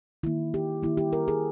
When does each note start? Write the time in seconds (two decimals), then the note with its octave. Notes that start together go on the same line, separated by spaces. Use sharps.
0.23 D#3 A#3 E4
0.54 G4
0.83 D#3 A#3 E4
0.97 G4
1.13 A#4
1.28 G#4